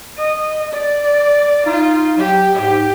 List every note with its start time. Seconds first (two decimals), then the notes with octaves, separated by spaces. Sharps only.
0.18 D#5
0.73 D5
1.66 D#4 F4
2.18 F#3 G4
2.55 G#2 G4